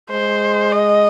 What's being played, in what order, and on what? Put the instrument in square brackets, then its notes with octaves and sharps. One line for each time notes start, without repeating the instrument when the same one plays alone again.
[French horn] G#3 [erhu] C5
[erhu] D#5